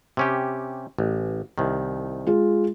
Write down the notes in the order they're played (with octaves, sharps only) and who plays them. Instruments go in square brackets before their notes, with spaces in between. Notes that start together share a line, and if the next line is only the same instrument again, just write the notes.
[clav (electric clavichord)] C3 C#4 G4
A1
C2 D#3
[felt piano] G#3 F4